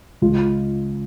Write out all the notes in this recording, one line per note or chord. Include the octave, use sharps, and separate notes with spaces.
C#2 C#3 G#3 F4